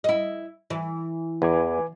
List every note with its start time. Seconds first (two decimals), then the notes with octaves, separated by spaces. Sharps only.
0.04 E4 D#5
0.70 E3
1.42 E2 B4 G#5 D6